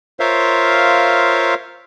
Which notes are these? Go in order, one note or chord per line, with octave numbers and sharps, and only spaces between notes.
F4 A#4 C5 C#5 E5 F5